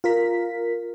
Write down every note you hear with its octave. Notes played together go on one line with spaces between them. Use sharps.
F4 A#4 B6